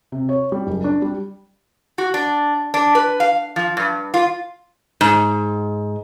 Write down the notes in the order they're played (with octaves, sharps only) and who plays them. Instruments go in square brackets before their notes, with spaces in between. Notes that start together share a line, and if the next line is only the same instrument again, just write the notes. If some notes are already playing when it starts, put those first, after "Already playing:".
[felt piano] C3
C#5
G3
F#1
D4
G3
[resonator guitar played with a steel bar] F#4
D4
D4
B4
F5
F3
G2
F4
G#2